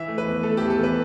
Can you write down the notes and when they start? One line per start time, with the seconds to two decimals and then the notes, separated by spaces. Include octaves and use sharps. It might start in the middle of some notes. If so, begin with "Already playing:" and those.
Already playing: E3 E5
0.08 A3
0.18 B4
0.26 E2
0.43 A3 A4
0.57 E2 G4
0.70 A4
0.79 E2 B4